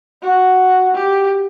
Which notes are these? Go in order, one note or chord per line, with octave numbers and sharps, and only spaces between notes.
F#4
G4